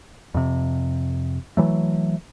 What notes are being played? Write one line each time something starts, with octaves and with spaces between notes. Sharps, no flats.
F2 C3
E3 F#3 A3